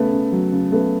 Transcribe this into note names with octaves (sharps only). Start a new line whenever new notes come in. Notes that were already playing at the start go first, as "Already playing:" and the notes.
Already playing: C#3 A3 B3
C#3
F#3
C#3
C#3 A3 B3